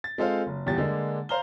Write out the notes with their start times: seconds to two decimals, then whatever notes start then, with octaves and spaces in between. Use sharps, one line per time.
0.04 A6
0.18 G#3 C4 F4 A4 C5 F5
0.47 F#1
0.66 D#1 E2 G4 A6
0.78 D3 G#3 A#3 D4
1.29 C5 F5 A#5 F6 G7